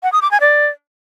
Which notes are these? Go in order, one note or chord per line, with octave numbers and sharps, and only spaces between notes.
F#5
D#6
D6
G#5
D5